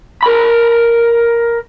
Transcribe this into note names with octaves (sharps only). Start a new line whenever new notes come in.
A#4 B5